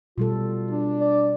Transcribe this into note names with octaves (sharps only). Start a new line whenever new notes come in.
B2 G3 F4 A4
D4
D5